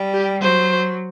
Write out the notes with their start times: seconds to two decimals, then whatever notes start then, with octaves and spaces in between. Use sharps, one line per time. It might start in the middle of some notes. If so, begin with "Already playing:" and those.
Already playing: G3
0.14 G4
0.42 F#3 C5